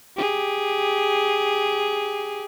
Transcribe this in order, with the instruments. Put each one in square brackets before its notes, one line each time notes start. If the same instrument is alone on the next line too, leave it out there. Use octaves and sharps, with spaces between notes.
[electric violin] G4 G#4